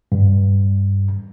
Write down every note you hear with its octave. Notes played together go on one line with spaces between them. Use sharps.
G2